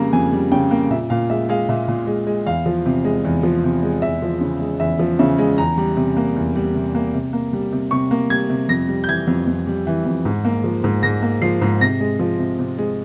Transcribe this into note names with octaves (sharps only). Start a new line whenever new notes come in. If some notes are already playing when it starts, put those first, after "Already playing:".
Already playing: F2 C#3 G3 A#3 A#5
F2 G#5
G3
C#3 G5
A#3
A#2 E5
A#2 F5
G#3 E5
G#3 F5
A#2 E5
A#2
G#3
G#3
E2 F5
F3
C3
G#3
E2
F3
C3
G#3
E2 E5
F3
C#3
G#3
E2 E5
F3
C#3 E5
G#3
E2 A#5
G3
C3
A#3
E2
G3
C3
A#3
C3
A#3
G3
C3
C3 C#6
A#3
G3 G#6
C3
F2 A#6
G3
G6
E3 G#6
F2
F2
G3
E3
F2
G#2
A#3
F3
G#2
G#2 A#6
A#3
F3 C7
G#2
C3 A#6
G#3
F3
C3
C3
G#3